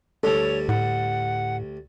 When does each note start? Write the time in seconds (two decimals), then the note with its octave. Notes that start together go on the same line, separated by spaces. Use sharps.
0.23 D2 G3 A4 C#5
0.69 A2 F#5